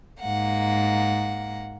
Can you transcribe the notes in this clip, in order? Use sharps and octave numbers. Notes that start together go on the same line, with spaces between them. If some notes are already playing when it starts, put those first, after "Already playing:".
G#2 A#3 F#5